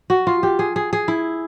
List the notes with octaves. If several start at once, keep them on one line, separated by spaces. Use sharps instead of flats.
F#4
F4
G4
G#4
G#4
G#4
E4